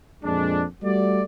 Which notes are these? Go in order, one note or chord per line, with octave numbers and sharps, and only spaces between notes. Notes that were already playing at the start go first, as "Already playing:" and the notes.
F2 A#2 G#3 D4
G3 A3 F#4 D5